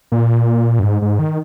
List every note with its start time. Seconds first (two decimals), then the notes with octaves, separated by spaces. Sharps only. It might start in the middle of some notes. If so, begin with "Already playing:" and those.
0.12 A#2
0.79 F#2
0.83 G#2
1.02 G#2
1.19 D#3